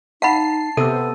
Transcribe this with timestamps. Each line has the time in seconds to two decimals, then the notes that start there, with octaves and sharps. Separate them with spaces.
0.22 D#4 F5 F#5 A5 B5 A6 C7
0.77 C3 B3 A4 E6 D#7